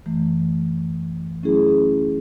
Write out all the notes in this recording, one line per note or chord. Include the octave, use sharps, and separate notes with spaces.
F#2 E3 A3
F#3 A3 C#4 E4 G#4